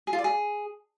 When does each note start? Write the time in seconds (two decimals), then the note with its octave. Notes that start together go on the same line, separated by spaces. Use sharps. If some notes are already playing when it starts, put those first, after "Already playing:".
0.07 G#4
0.13 F4
0.19 D5
0.24 G#4